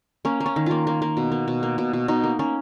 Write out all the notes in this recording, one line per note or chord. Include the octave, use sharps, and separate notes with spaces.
A#3 C#4
A#3
C#4
D#3
A#3 F4
A#3
A#3
B2
A#3
B2
A#3
B2
B2
B2 D#4
A#3
A#3 C#4